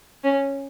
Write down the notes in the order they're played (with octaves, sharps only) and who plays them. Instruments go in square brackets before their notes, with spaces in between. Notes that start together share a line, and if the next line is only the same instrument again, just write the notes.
[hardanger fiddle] C#4